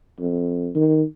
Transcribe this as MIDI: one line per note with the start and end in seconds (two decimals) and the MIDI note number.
0.19 0.70 41
0.75 1.04 51